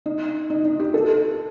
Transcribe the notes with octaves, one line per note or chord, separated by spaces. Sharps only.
D#4
D#4
D#4
G4
A4